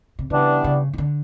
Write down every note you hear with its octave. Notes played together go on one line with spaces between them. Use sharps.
C3
C#3 E3 G3 B3 D4
C#3
D#3
D3